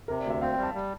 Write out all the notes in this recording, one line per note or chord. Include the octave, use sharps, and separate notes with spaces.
C3 A#4
D5
D2
E5
C4 F5
G5
G3
A5
G3